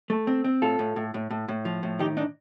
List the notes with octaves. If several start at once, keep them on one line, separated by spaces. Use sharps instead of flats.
A3
C4
C4
A2 F4 A4
A2
A2
A2
A2
A2
F3
A2
D#3 D#4 G4
D4 D#4